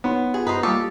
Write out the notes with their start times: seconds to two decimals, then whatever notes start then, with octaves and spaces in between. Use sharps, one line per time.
0.04 B3 D#4 C#5 C6
0.34 F4 G4 G#4
0.47 G2 D#4 B4 C5
0.63 G3 A#3 F4 G4 A4 C#6